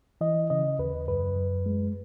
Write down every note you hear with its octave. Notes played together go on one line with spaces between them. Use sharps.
E3 D#5
C#3 D#5
D#2 B4
F#2 B4
F#2
G#3